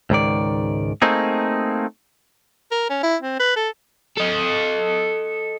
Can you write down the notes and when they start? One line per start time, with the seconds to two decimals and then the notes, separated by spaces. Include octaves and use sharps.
0.10 C#2 G#2 D#3 D5
1.02 A3 A#3 C4 D#4 G#4
2.71 A#4
2.90 C#4
3.03 E4
3.22 C4
3.39 B4
3.56 A4
4.18 A4 D#5